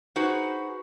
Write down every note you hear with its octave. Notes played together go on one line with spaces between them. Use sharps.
D#4 F#4 G#4 B4 C5